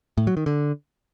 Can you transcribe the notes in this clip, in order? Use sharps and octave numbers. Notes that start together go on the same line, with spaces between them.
A2
F#3
D#3
D3